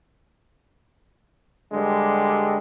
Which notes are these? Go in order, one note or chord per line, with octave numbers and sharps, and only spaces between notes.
G2 D3 G3 G#3